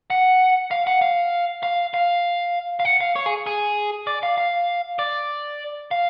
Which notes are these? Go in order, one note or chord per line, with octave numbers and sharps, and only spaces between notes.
F#5
F5
F#5
F5
F5
F5
F5
F#5
F5
C#5
G#4
G#4
D5
F5
F5
D5
F5